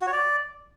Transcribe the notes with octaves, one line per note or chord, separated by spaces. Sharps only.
F#4
C#5
D5